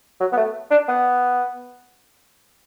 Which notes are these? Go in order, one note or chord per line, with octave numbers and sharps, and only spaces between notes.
F#3
B3
A3
D4
B3